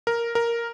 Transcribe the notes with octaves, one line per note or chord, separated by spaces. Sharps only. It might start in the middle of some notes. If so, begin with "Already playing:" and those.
A#4
A#4